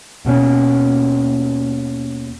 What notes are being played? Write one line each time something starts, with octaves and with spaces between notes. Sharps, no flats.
D#2 B2 G3 C#4